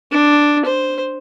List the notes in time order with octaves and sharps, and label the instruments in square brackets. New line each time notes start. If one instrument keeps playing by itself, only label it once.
[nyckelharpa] D4
C5